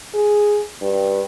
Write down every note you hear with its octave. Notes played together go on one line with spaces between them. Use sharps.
G#4
G2